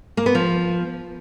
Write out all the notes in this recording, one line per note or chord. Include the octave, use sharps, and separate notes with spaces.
A#3
B3
F3